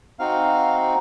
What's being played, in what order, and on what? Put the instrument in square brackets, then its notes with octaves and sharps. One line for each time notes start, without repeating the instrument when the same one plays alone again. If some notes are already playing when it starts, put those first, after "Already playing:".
[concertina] C4 D#4 F#4 F5